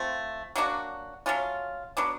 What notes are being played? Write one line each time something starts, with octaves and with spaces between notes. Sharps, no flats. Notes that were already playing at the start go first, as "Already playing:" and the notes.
Already playing: F3 A3 C4
F#3 A#3 D4 F#4
F#3 A3 C#4 F4
F#3 B3 D4